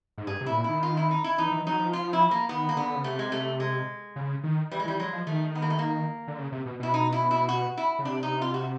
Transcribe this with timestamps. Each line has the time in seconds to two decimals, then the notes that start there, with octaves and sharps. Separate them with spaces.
0.18 G#2
0.27 G2 G#4
0.41 C3
0.46 A2 E4
0.55 A#2
0.64 D#3 E4
0.83 F4
0.97 E4
1.11 D#4
1.24 E4
1.38 E3 D#4
1.52 E3
1.66 F#3 D#4
1.79 F3
1.93 F4
2.13 E4
2.31 A#3
2.49 D#3 B3
2.69 A#3
2.77 D3 B3
2.95 C#3
3.04 C3 A3
3.19 G#3
3.32 A3
3.60 G#3
4.16 C#3
4.44 D#3
4.71 E3 G3
4.80 G#3
4.85 E3 G3
4.99 F#3 G#3
5.13 F3
5.27 D#3 A3
5.55 B3
5.62 A#3
5.70 A3
5.79 A#3
6.28 D3
6.38 C#3
6.52 C3
6.66 B2
6.80 B2 E4
6.94 D#4
7.12 E4
7.31 E4
7.49 F#4
7.77 E4
7.99 C#3
8.05 C3 D4
8.23 D#4
8.41 F4
8.54 F#4